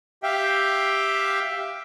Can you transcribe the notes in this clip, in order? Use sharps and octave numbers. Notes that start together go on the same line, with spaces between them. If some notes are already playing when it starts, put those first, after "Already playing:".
G4 E5 F5 G5